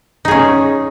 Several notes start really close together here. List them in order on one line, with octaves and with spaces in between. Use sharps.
D#4 G#4 C#4